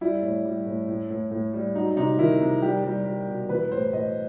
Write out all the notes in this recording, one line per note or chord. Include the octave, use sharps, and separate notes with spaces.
G3 E4
A2
G3
A2
A2
A2
A2
G3
F#3 D#4
C3 D#4
D#3 E4
C3
G3 G4
G3
G3
B2
E3 B4
A2 C5
A2 D#5